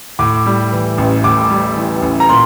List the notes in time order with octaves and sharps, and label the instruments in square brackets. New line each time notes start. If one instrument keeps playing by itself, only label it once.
[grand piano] A2 D6
G3
E3
A1
A2 D6
G3
E3
A1
A#5
A#2 C6